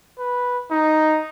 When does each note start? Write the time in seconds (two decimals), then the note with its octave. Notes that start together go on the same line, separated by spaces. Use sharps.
0.19 B4
0.71 D#4